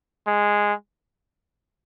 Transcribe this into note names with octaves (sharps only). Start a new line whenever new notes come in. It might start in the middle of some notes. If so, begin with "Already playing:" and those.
G#3